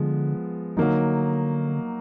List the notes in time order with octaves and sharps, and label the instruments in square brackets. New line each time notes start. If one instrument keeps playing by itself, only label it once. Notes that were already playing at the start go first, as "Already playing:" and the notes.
Already playing: [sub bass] D3 [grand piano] F3 G#3 B3
[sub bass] D3 [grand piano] F#3 A#3 D#4